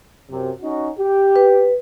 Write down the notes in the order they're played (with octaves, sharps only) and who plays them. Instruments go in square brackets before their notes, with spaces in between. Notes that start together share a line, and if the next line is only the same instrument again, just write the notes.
[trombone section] F#2 C3
C#4 D#4 F#4
G4
[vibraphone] B4